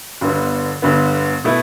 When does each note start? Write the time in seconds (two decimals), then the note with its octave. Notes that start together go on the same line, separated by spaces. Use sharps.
0.21 G1 G2 D3 B3
0.82 G1 G2 D3 B3
1.44 B2 A3 E4 B4